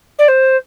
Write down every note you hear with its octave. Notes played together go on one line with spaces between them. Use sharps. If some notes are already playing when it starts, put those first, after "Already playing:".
D5
C5